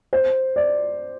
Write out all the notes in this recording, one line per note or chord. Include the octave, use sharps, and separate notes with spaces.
C5
D5